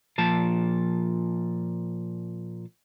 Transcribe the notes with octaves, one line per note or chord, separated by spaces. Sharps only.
A#2 F3 A5